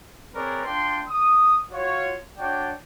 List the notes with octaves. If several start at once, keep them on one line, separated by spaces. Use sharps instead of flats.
C4 G#4 A#4 B4 C#5 D5
D4 F4 G5 C6
D#6
F4 F#4 C#5
D4 F#4 C#5 D5 G5